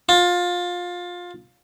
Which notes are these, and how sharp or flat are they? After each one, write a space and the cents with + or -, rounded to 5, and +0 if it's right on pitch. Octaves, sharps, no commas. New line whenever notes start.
F4 +20